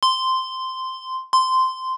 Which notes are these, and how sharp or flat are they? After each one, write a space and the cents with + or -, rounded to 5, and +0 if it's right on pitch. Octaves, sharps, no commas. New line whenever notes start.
C6 -10
C6 -15